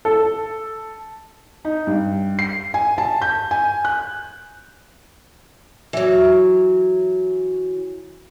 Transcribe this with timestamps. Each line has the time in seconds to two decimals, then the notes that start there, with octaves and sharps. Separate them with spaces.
0.05 A4
1.65 D#4
1.87 G2
2.39 C7
2.74 G#5
2.98 A5
3.22 G6
3.51 G#5
3.85 F#6
5.93 E3 F#3